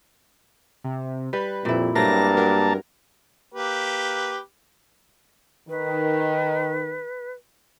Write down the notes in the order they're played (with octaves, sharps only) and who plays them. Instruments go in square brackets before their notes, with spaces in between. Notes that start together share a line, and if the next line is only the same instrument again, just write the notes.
[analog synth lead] C3
[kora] G3 [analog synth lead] B4
[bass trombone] F2 [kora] A#2 E4
[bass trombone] G2 [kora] F#3 A3 C4 [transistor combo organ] A#3 A5 [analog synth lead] A#6
[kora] F#3 [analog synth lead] A#4
[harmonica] A#3 G4 B4
[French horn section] D#3 [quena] B4